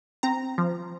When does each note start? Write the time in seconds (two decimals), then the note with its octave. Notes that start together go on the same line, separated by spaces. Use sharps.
0.23 C4 A#5
0.58 F3